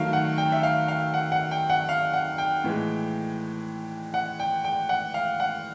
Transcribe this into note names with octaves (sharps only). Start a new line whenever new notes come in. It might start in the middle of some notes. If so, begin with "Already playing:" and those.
Already playing: D#3 F#3 A3 F5
F#5
G5
E5
F5
F5
F#5
F#5
G5
F#5
F5
F#5
G5
A2 E3 G#3
F#5
G5
G5
F#5
F5
F#5